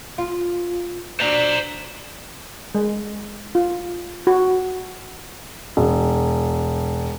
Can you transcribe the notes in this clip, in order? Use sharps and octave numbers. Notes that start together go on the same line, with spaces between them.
F4
F#3 D4 C5 D5 A#5
G#3
F4
F#4
E1